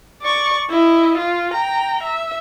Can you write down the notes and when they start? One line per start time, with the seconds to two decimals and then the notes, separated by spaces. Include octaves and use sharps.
0.22 D5 C#6
0.70 E4 D#5
1.18 F4
1.53 G5 A#5
2.03 E5